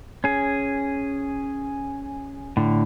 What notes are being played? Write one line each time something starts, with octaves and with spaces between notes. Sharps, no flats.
C#4 G#4
A2 D3